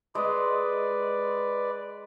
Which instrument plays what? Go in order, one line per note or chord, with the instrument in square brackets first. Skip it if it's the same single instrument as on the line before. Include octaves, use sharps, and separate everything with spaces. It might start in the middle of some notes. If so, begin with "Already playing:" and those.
[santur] G#3 D#5 [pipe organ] B4 D5